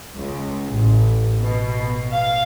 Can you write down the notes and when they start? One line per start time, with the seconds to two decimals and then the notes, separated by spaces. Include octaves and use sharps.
0.17 C#2
0.68 A1
1.41 B2
2.12 F5